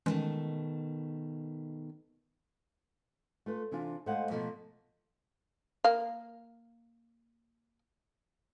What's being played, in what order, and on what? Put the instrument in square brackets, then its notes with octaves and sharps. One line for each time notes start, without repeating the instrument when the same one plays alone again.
[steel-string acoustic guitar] B2 D#3 A3 [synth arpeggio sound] E3 G#3 C#4
[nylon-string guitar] A3 F4 B4
C3 E3 D4 F4
A2 G#3 C5 D#5 F5 F#5
B2 F3 A3 A#3
[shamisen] A#3 F5